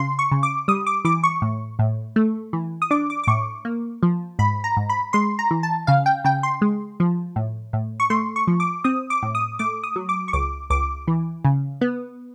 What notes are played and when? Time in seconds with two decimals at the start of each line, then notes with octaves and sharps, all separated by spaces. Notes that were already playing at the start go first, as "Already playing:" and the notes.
Already playing: C#3 C6
0.19 C#6
0.32 C#3
0.43 D6
0.68 G3 D#6
0.87 D6
1.05 E3 D6
1.23 C#6
1.42 A2
1.79 A2
2.16 A3
2.53 E3
2.82 D#6
2.91 D4 D6
3.10 D6
3.23 D6
3.27 A2 C#6
3.65 A#3
4.03 F3
4.39 G#2 B5
4.64 A#5
4.77 G#2
4.89 B5
5.13 G#3 C6
5.39 A#5
5.51 E3
5.63 A5
5.87 C#3 F5
6.06 G5
6.24 C#3 G5
6.43 C6
6.62 G#3
7.00 F3
7.36 A2
7.73 A2
8.00 C#6
8.10 A3 C6
8.36 C#6
8.47 F3
8.60 D6
8.84 C4 D#6
9.10 D6
9.23 A2
9.35 D#6
9.59 A3 D6
9.84 D#6
9.96 F#3
10.09 D6
10.28 C#6
10.33 C#2 D6
10.70 C#2 D6
11.08 E3
11.45 C#3
11.81 B3